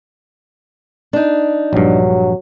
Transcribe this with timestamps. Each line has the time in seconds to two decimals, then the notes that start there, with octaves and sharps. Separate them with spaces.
1.13 D4 D#4
1.73 A#1 G2 F#3